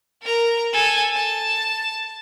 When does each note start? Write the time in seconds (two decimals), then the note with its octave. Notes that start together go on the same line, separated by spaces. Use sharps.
0.22 A#4 A#5
0.73 A4 G#5
1.16 A5